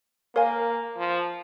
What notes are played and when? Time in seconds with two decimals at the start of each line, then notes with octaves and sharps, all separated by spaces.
0.35 A#3 A#4 C#5 F5 G#5
0.97 F3